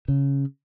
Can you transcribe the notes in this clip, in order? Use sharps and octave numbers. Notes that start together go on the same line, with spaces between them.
C#3